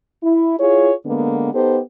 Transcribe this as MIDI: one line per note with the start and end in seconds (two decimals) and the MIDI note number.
0.23 0.56 64
0.59 0.92 64
0.59 0.92 65
0.59 0.92 68
0.59 0.92 73
1.06 1.53 50
1.06 1.53 56
1.06 1.53 58
1.06 1.53 59
1.54 1.78 59
1.54 1.78 63
1.54 1.78 67
1.54 1.78 69
1.54 1.78 72